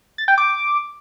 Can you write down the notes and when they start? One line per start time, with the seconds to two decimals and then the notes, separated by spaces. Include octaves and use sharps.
0.18 A6
0.28 G5
0.38 D6